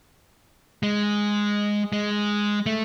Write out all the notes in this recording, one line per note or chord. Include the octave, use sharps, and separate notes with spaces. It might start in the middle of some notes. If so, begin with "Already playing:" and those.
G#3
G#3
A3